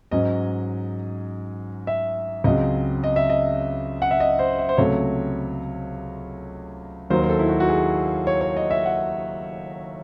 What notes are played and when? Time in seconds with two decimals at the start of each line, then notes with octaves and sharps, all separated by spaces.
0.11 G#2 F#3 C#4 D#5
1.87 E5
2.44 C#2 C#3 F#3 C4 D#5
3.04 D#5
3.16 E5
3.29 D#5
4.02 F#5
4.11 E5
4.20 D#5
4.39 C5
4.59 E5
4.69 C5
4.77 C#2 C3 F#3 A3 C#5
7.10 D#2 D#3 F#3 C5
7.24 C5
7.30 A4
7.39 E4
7.49 F#4
7.60 F#4
7.69 G#4
8.27 C#5
8.41 C#5
8.57 D#5
8.71 E5
8.85 F#5